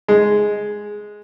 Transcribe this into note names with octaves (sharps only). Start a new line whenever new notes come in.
G#3